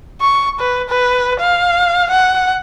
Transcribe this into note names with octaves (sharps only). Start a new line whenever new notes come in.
C#6
B4
B4
F5
F#5